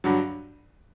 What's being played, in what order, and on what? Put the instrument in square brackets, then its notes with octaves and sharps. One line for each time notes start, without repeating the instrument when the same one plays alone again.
[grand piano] G2 D3 F#3